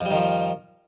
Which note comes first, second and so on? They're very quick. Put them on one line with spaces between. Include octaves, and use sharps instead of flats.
F2 G3 D#3 F3